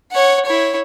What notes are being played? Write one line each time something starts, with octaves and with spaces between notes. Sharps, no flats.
C#5 F#5
E4 C#5